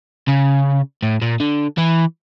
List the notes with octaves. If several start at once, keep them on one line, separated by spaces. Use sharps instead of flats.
C#3
A2
A#2
D3
E3